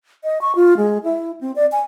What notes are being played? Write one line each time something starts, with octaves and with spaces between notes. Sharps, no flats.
D#5
C#6
F4
G#3
E4
C4
D5
G#5